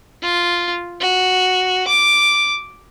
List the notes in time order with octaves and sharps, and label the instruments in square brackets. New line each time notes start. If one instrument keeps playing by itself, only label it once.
[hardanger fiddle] F4
F#4
D6